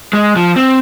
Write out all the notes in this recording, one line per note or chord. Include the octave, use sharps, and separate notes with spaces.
G#3
F3
C4